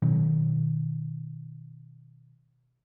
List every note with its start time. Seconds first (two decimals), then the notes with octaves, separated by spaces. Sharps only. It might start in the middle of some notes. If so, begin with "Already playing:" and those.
0.02 B2 D#3 F#3